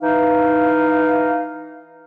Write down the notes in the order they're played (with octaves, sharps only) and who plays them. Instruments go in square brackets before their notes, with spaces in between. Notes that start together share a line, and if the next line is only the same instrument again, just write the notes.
[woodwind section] E3 D#4 F5